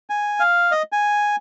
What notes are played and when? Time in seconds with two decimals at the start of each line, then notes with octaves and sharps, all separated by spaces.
0.10 G#5
0.40 F5
0.72 D#5
0.92 G#5